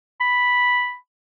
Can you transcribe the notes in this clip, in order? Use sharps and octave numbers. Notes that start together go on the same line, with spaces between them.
B5